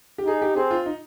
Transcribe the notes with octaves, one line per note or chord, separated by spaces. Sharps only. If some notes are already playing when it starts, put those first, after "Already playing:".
G4
D#4 G#4
G4
C4 G#4
F4
D#4